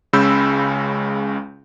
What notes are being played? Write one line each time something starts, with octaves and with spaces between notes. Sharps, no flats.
C#2 C#3 G#3 B5 E6 G6